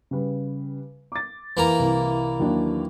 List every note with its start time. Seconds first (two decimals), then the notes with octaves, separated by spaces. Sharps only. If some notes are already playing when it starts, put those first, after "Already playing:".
0.11 C#3 G3 B4
1.12 D6 A6
1.57 E3 A#3 A#5
1.79 C2
2.40 D#2 F#3 D4